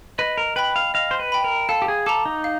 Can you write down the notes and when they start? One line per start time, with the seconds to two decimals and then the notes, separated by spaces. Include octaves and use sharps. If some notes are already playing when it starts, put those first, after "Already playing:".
0.18 B4 D#5
0.38 A#4
0.56 B4 G5 B5
0.76 F5
0.94 D#5 F5
1.11 C5
1.19 B4
1.32 G5 B5
1.44 A#4
1.69 A4 F5
1.82 G4
1.88 G#4
2.06 A4 A#5 D6
2.25 D#4
2.44 F5